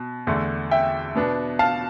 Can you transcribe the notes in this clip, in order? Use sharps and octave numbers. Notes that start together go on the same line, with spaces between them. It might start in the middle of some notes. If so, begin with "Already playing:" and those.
Already playing: B2
E2 D3 A3
E5 G5
B2 B3 D4
F5 A5